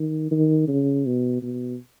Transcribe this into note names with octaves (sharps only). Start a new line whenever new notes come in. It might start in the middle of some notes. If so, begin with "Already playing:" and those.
Already playing: D#3
D#3
C#3
B2
B2